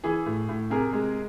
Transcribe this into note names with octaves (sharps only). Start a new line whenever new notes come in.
E3 G#4
A2
A2
C3 G#4 A#4
G#3